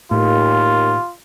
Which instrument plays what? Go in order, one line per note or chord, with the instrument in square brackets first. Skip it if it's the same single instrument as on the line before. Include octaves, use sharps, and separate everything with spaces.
[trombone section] D#2 [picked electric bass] A2 [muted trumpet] F4